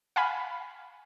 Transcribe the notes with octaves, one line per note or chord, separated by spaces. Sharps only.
F5 F#5 G#5 B5